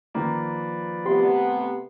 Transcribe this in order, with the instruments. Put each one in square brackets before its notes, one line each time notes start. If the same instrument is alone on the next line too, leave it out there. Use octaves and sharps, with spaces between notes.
[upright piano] D#3 A#3 [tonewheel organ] F3 B4 D5
[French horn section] C3 A3 B3 [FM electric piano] G4 C6